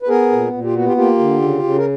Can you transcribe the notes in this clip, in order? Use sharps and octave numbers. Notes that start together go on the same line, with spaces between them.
B4
B3 G#4 A#4
A#2
A#2
F4 G4
B3 F#4
F4 G4
A#3 F4 G4
D3
C#3
C#3
A#4